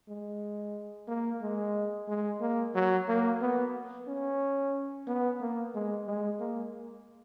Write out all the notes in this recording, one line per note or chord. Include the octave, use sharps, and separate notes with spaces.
G#3
A#3
G#3
G#3
A#3
F#3
A#3
B3
C#4
B3
A#3
G#3
G#3
A#3